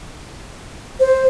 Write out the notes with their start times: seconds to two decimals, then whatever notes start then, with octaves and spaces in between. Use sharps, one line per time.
1.00 C5